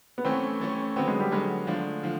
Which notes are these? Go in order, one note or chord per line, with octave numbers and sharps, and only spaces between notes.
B3
E3 A3 C4 C#4
E3 A3 C#4
D3 F#3 B3 C4
G#3
G3
D3 F#3 G#3 B3
D3 F3 A3 D4
D3 F3